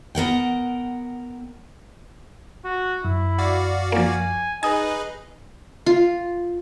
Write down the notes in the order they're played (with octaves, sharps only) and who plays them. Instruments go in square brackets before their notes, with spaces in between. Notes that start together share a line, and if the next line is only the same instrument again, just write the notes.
[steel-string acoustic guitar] B3 A#4 F#5 G5
[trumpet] F#4
[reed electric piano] F#2 [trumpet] E4
[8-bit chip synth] F#4 D5 F5
[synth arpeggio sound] F3 A#3 [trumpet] G#5
[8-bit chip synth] D#4 G#4 B4 [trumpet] D#5 [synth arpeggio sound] G#5 D#6
[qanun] F4